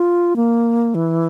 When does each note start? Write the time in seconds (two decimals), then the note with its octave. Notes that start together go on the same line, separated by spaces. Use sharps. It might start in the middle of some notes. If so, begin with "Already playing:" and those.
Already playing: F4
0.36 A#3
0.95 E3